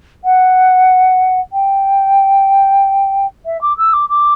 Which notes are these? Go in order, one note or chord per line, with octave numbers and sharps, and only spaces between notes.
F#5
G5
E5
D6
E6
D6
D6